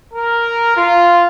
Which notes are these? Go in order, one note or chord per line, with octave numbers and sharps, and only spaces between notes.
A#4
F4